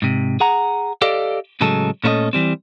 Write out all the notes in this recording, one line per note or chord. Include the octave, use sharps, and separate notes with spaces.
G#2 C3
G#4 F#5 A#5
G4 A4 D5 D#5 F5
A2 C#3 F#3 G#3 A4
A#2 A3 C#4 E4 A4 D#5
E3 G3 C4